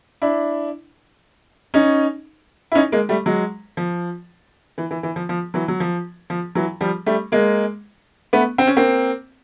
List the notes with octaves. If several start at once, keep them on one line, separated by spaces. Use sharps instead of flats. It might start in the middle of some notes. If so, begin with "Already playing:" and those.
D4 E4
C#4 D#4
E4
C#4 D#4
G#3 A#3
G3 A3
F#3 G#3
F3
E3
E3
E3
F3
F3
E3 F#3
F#3
F3
F3
E3 F#3
F3 G3
G3 A3
G#3 A#3
A3 B3
C4
C#4
A#3 C4